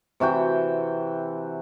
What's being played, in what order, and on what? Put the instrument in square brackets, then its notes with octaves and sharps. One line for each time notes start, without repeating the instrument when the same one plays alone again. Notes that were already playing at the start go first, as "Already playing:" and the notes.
[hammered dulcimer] C3 E3 F#4 G5